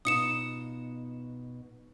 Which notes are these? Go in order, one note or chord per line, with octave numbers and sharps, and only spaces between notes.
B2 D#4 F4 D#6 C#7 E7